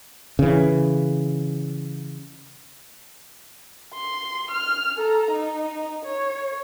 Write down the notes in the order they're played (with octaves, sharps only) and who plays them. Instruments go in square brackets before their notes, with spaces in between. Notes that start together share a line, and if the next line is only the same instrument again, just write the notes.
[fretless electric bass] C#3 E3
[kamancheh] C6
F6
A4 A#5
D#4
C#5